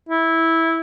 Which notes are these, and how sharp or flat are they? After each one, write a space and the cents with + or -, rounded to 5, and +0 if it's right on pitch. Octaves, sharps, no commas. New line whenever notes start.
E4 -10